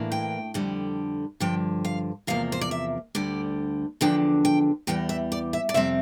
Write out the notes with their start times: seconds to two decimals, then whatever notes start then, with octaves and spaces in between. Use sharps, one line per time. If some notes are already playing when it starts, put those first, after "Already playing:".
Already playing: A2 E3 A#3 D4
0.12 G5
0.54 F2 D3 G3
1.40 G2 D3 F3 G5
1.85 F5
2.27 E2 C3 F3 A#3 F5
2.52 C5
2.61 D5
2.71 E5
3.15 D2 D3 G3 D5
4.01 E2 D3 F3 D4 G5
4.45 G5
4.87 E2 E3 G3 G5
5.09 E5
5.32 D5
5.53 E5
5.69 D5
5.74 F2 C3 G3 C4 E5